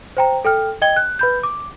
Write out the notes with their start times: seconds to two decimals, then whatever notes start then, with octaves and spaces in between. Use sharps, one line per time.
0.17 C5 G5 A#5
0.45 A4 G5 F6
0.82 D#5 G5 G#6 G7
0.96 F#6
1.19 B4 B5 G6
1.43 D6